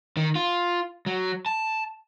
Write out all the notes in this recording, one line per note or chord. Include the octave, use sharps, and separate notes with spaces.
D#3
F4
F#3
A5